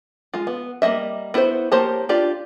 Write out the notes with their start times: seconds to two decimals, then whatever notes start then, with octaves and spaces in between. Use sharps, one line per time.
0.34 G#3 F4
0.47 B3
0.82 G3 A#3 C4 D#5 E5
1.34 B3 E4 F#4 B4 C5
1.72 A#3 G4 C5 C#5 A5
2.09 D4 F4 G4 D5